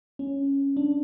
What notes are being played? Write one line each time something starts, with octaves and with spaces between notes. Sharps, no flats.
C#4
D4